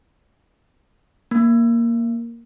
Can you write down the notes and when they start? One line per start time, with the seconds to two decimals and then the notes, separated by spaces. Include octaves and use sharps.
1.31 A#3